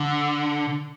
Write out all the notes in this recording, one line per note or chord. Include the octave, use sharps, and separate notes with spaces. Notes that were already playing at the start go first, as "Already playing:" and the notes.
Already playing: D3